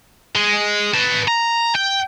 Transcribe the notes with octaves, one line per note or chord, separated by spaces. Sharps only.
G#3
B4 A5
A#5
G5